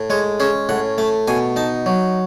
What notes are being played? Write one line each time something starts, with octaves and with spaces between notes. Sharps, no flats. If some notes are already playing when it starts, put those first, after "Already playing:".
Already playing: A2
G#3 C#5
C#4 G#4
A2 F#5
A3 A5
B2 G#5
D#4 A5
F#3